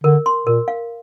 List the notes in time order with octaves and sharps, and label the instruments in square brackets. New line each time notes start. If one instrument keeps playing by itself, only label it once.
[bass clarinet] D3 [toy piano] A#4
[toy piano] C6
[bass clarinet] A#2 [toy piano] A#4
[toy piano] F5